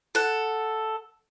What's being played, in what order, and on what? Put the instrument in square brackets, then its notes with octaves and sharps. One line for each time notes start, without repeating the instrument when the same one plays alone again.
[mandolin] A4 F#5